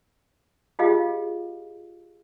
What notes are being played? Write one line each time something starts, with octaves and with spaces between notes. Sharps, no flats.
F4 G4 G#4 D#5 F5